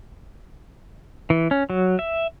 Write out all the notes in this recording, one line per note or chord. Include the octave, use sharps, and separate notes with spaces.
E3
C#4
F#3
E5